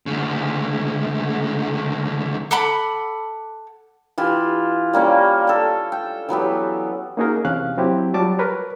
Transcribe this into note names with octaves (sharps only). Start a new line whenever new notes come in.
D2 C#3
A4 F#5 B5 D6
E3 F4 G4
G3 A#3 C#4 D5
A4 G5
G5
E3 F#3 B3 G4
A#3 C#4 D#4 F#4 G#4 A#4
E2 C3 C#4 F5 F#6
F#3 C4 E4 G4
F#3 G3 F4 A5 D6
A#4 B4 C#5